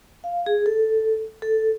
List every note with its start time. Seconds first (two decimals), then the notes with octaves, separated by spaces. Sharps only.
0.24 F5
0.46 G#4
0.66 A4
1.42 A4